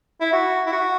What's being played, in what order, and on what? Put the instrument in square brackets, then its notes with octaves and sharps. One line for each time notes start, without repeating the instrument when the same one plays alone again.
[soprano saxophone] E4
F#4
E4
F#4